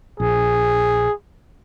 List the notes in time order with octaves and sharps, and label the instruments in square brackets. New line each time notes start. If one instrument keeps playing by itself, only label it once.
[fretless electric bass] A#1 [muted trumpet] G#4